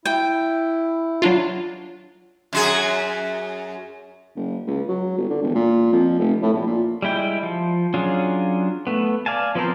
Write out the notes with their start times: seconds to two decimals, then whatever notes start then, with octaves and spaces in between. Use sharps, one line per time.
0.05 E4 G5
1.22 F#3 D4 F4
2.53 F#2 F#4 G#4
4.36 F#1
4.67 C#2
4.89 F#3
5.18 G1
5.30 D3
5.42 E1
5.55 A#2
5.93 F2
6.19 F1
6.42 A2
6.54 A#1
6.67 A#2
7.02 G3 G#3 E4 G5
7.43 F3
7.94 F#3 C#4 D4 F4 G#4
8.87 A3 B3
9.26 D5 F5 G#5 A5
9.55 F3 B3 C4 A#4 C5